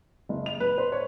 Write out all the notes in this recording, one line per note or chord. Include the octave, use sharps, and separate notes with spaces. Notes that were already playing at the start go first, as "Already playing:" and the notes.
F#1
F7
B4
C5
C#5